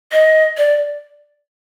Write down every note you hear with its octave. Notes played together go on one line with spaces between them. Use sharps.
D#5
D5